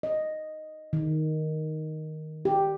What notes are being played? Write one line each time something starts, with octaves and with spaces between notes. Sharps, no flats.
D#5
D#3
G4